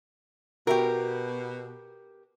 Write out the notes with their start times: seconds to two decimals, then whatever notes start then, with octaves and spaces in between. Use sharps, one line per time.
0.67 B2 F#4 G4 A#4 E5 G5